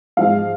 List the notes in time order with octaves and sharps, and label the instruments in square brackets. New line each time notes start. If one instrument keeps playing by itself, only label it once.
[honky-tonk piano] G#2 F3 G#3 F5